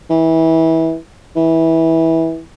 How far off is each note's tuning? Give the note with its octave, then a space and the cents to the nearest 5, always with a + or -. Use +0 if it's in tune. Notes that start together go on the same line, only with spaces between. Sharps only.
E3 -25
E3 -20